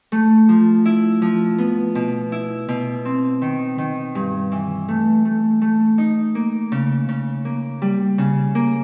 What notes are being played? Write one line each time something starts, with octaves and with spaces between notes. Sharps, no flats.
A3
F3
E4
F3
B3
B2
E4
B2
C4
D#3
D#3
G2
E3
A3
A3
A3
D#4
A#3
C#3
C#3
A#3
G3
C#3
A#3